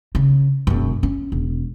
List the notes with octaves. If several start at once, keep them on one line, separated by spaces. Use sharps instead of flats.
C#3
E1 F#2
C#4
E1